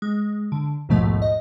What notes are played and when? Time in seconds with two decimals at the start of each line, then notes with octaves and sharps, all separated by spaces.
0.02 G#3
0.52 D3
0.89 A#1 D#2 G#2 B2 F3 A3
1.22 D#5